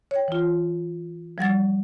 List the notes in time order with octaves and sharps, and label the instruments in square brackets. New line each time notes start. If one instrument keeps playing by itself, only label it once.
[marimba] C#5 G5
E3 F4
F3 G3 F#5 A6